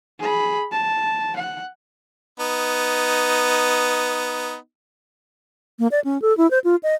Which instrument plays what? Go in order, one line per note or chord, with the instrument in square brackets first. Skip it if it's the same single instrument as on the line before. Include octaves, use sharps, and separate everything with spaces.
[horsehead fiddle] G#4 B5
A5
F#5
[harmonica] B3 D#4
[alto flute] A#3
D5
C#4
A4
E4
C5
F4
D#5